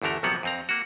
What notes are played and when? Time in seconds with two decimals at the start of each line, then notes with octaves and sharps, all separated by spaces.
0.02 G1 E2 D3 A3 A#4
0.23 A#1 C3 F3 F#3 B3 F#5
0.43 F2 C4 A#5
0.69 A#3 F#4